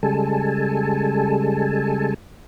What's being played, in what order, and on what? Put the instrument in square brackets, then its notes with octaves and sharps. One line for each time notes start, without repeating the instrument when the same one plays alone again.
[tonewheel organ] C#3 G3 G#3 A4 G#5 A5